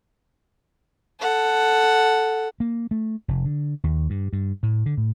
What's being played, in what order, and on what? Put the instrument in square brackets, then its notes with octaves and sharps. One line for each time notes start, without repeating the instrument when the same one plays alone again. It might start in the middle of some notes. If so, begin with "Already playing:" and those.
[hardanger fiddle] A4 F#5
[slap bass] A#3
A3
F1
D3
D#2
G2
G2
A2
D3
A2